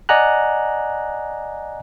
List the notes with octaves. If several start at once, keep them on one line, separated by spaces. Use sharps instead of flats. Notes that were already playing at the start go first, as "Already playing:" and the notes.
D5 D#5 F#5 G#5 A#5 F#6